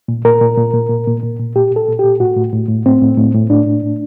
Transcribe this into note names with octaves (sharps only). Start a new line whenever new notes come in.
A#2
A#2 A#4
A#2
A#2
A#2
A#2
A#2
A#2
A#2
A#2 G4
A#2
A4
A#2
A#2 G4
A2 F#4
A2
A2
A2
A2 C4
A2
A2
A2
A2 D4
A2
A2